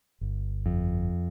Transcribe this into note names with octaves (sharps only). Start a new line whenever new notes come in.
G1
F2